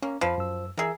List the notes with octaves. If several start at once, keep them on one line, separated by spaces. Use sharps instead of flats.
A#3 C#4
F2 F3 F5 B5
F#2 E6
E3 G#4 A#4 E5 E6